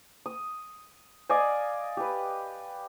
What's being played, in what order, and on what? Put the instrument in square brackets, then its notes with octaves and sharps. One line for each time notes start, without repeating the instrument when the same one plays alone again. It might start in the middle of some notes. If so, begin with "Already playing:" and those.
[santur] D#6
D5 D#5 F5 G#5
G4 B4